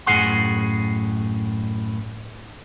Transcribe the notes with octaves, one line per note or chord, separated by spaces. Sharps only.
F#2 A2 C#3 G#4 F#5 C6